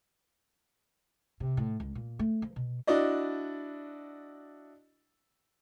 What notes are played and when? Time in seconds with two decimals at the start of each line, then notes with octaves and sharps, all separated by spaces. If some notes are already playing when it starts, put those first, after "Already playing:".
1.40 C3
1.57 A2
1.80 C#2
1.95 A#2
2.19 A3
2.42 F3
2.56 B2
2.87 D4 E4 F#4 D5 D#5